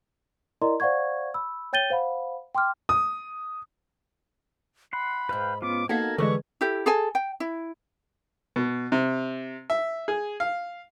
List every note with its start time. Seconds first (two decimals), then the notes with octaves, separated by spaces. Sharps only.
0.62 E4 A#4 D5 D#5 A#5 C6
0.80 C5 D5 F5 F#5 C#6 G#6
1.34 B5 E6
1.73 C#5 G5 G6 A6 D#7 G7
1.90 C5 F5 F#5 B5
2.55 G5 C6 D6 F6
2.89 D#6
4.93 F#5 B5 C6
5.29 E2 G#2 B4 F5 G5
5.62 B3 C#4 F4 D6
5.89 A#3 B3 D#4 F#4 A4 A#4 G#6
6.18 D3 E3 G3 G#3 G#4 C#6
6.61 E4 G4 A4
6.86 G#4 A4 G#5
7.15 G5
7.40 E4
8.56 B2
8.92 C3
9.70 E5
10.08 G#4
10.40 F5